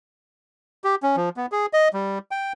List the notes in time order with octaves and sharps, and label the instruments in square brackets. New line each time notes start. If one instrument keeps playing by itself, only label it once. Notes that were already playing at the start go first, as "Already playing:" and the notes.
[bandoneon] G4
C#4
F3
B3
G#4
D#5
G3
G5